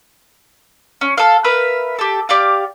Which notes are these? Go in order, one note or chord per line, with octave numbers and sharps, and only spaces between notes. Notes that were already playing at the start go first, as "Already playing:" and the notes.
C#4
A4 F5
A#4 B4 E5 F5
G4 A4
G4 D5 F5